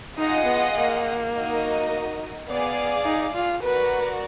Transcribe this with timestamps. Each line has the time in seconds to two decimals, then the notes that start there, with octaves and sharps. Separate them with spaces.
0.17 D#4 F4 G#4 D#5 F#5
0.46 B3
0.75 A#3
1.32 D#4 F#4 A#4 D#5
2.48 B3 G#4 D5 F5
3.05 D#4
3.34 F4
3.62 F#4 A#4 B4 D5